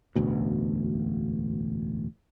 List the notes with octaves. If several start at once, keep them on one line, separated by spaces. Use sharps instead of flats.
E1 A1 D2 B2